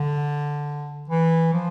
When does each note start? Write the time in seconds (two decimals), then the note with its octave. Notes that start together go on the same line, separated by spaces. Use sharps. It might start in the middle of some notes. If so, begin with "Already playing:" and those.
Already playing: D3
1.10 E3
1.53 F3